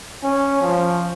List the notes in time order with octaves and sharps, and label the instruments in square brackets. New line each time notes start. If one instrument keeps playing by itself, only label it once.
[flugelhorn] C#4
F3